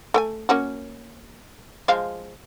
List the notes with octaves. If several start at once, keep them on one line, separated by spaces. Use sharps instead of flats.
A3 G5 G#5
A#3 C#4 F#4
F3 G#3 F5